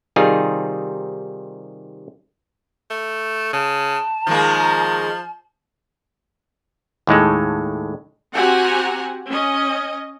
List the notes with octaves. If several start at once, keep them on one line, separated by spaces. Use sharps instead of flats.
C3 D#3 G3 D#4 F4 G#4
A3
C#3 A5
D#3 F3 G#3 A#3
D#2 A2 G#3 A4
C4 F#4 G4 F#5 G#5 A#5
C#4 D#5